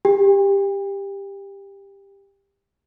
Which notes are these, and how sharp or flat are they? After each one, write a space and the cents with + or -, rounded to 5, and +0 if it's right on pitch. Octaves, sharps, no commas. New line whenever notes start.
G4 +15 G5 +40